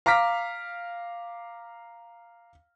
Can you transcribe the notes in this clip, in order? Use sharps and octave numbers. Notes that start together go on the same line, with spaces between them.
F5 A#5 D6 F6 B6